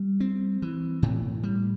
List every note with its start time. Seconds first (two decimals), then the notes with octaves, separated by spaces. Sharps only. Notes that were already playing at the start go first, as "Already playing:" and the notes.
Already playing: G3
0.20 C4
0.62 E3
1.02 A2
1.43 G3